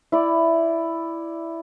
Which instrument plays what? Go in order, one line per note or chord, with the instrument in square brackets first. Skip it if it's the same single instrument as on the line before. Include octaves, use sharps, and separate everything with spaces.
[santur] E4 D5